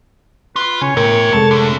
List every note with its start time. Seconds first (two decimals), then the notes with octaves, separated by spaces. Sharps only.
0.56 F4 B4
0.82 C#3 C#5 G#5
0.97 A2 A#4 E5 G5 G#6
1.33 F2 C3 G#3 A4 A5
1.51 D3 A3